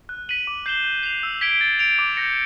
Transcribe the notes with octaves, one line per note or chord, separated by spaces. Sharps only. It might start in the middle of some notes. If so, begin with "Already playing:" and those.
F#6
B6 D#7 F#7
D6
G6 C7 E7 G7
G6
C7 F7
E6
G#6 B6 D7 G7
A6
D7 F7
D6
G6 A#6 C#7